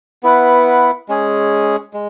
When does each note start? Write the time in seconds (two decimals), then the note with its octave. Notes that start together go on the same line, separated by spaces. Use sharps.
0.23 B3 E4 B4 F#5
1.08 G#3 C#4 G#4
1.93 G#3